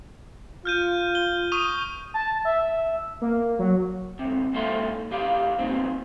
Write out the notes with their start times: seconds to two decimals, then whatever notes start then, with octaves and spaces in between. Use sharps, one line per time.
0.65 F4 F6 G6 D#7
1.15 G7
1.52 C#6 D#6 D#7
2.14 A5
2.45 E5
3.21 A#3
3.59 F#3
4.19 D2 C3
4.53 G#2 C3 A#3 A4 E5 C6
5.11 E2 G4 F5
5.59 B2 D#3 F3 A#3 C4